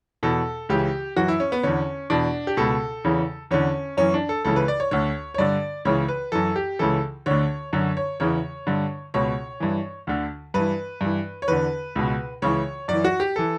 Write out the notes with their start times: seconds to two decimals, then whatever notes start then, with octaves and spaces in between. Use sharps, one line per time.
0.23 E2 B2 A4
0.69 C#2 C#3 E3 G4
1.16 F#2 E3 F#4
1.28 E4
1.40 C#4
1.52 B3
1.63 E2 D3 C#4
2.10 E2 B2 D4
2.47 G4
2.57 C#2 B2 A4
3.04 E2 C#3 E3
3.51 E2 D3 C#4
3.97 F#2 E3 C#4
4.14 D4
4.29 A4
4.45 C#2 C#3 E3 A4
4.56 B4
4.68 D5
4.80 C#5
4.91 D2 D3 C#5
5.34 C#5
5.38 G2 D3 D5
5.85 C#2 C#3 E3 C#5
6.08 B4
6.32 F#2 E3 A4
6.56 G4
6.79 C#2 C#3 E3 A4
7.26 D2 D3 C#5
7.73 F#2 D3 C#5
7.97 C#5
8.20 E2 C#3 E3 C#5
8.67 G2 D3
9.14 C#2 B2 C#5
9.60 G2 E3
10.07 D2 D3
10.54 G2 E3 B4
11.01 G2 E3
11.42 C#5
11.48 E2 D3 B4
11.96 C#2 B2
12.42 C#2 C#3 E3 C#5
12.88 F#2 E3 D5
13.05 F#4
13.20 G4
13.36 E3 A4